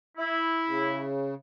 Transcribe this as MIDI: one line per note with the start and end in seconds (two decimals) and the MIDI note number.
0.18 1.06 64
0.66 1.34 49